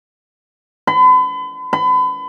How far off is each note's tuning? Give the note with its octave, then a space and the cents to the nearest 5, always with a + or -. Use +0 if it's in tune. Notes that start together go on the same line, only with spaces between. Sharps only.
B5 +40
B5 +35